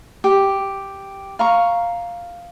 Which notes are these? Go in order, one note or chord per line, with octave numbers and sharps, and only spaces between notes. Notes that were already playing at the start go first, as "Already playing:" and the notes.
G4
F5 A#5 C#6